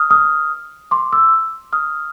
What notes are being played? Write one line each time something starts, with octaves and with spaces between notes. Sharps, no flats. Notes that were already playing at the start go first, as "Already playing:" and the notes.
Already playing: D#6 F6
D#6 F6
C6 D6
D6 E6
D#6 F6